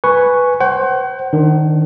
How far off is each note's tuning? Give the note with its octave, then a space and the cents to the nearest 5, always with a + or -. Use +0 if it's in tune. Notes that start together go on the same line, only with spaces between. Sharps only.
B4 +0 G#5 +0 C#6 +0
C5 +20 F#5 +40
D#3 -5 D4 +0